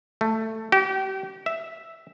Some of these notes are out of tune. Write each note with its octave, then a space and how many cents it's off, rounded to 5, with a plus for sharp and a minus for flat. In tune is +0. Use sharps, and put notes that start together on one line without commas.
A3 +10
G4 -35
E5 +0